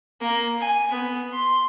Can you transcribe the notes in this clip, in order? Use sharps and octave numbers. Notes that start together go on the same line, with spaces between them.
A#3
G#5
B3
C6